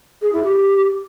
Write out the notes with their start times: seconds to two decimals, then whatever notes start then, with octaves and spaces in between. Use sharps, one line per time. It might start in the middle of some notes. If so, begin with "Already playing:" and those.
0.21 G#4
0.33 E4
0.44 G4